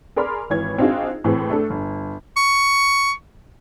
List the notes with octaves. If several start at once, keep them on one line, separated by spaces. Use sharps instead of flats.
G#4 A#4 D5 B5 C6 F6
G#1 E3 C#5 G#6
C4 D4 D#4 F4 F#4 G#4
A2 E3 C4 G#4
A3 D4 A4
G1
C#6